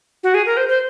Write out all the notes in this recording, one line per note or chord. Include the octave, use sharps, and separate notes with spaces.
F#4
G#4
A#4
C5
C5